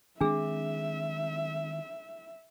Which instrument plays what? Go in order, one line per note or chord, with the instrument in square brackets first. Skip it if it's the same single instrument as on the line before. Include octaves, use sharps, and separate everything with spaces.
[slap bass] D#3 G#3 C4 [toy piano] D4 G#4 [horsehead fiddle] E5